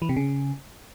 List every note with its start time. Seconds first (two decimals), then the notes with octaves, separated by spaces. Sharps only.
0.02 E3
0.09 C3
0.16 C#3